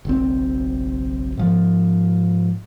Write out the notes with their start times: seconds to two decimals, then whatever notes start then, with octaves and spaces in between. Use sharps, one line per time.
0.05 F#1 B1 C4
1.37 G#2 F3